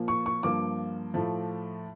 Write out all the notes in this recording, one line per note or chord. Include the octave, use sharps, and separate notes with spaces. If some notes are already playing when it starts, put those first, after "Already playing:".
Already playing: A#2 F3 A#3
C#6
C#6
G2 F3 A#3 D6
A2 F3 A3